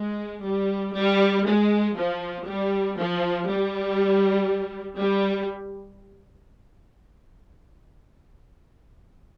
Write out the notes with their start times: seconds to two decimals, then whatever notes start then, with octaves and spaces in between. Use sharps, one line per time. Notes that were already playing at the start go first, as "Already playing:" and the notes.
Already playing: G#3
0.43 G3
0.95 G3
1.46 G#3
1.96 F3
2.46 G3
2.97 F3
3.48 G3
4.99 G3